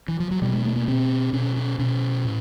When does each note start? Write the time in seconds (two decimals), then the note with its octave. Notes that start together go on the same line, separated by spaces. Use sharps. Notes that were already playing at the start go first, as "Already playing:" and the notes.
0.08 E3
0.20 F3
0.31 F#3
0.42 B2 G3
0.53 G#3
0.65 A3
0.76 A#3
0.88 B2 C4
1.33 B2 C#4
1.56 C#4
1.79 B2 C#4
2.25 A2